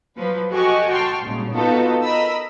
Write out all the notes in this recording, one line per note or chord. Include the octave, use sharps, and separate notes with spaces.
F3 F#3 B4
F#4 G4 A4 D#5 G#5 C#6
G5 A5 C6 C#6 F6
G#1 A#2 C#3 G3
B3 D#4 F4 F#4 A4 B4
A#4 D#5 B5 E6